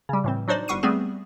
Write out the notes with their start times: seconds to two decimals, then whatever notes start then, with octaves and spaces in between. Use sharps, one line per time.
0.09 C#3 G3
0.24 A2 E3 C4
0.48 F#3 D4 D#4 C5 D5
0.68 G1 G3 F#5 C#6 C7 D#7
0.83 G3 A3 B3 C4 G#4